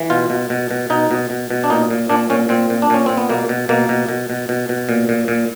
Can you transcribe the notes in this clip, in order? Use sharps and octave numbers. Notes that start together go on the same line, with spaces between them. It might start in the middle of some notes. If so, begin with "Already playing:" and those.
Already playing: E3
B2 F4
B2
B2
B2
B2 D#4
B2
B2
B2
D4
A#2 D#4
A#2
A#2 D4
A#2 C#4
A#2 C4
A#2
D4
A#2 C#4
A#2 C4
B3
B2 A#3
B2
B2 A#3
B2
B2
B2
B2
B2
A#2
A#2
A#2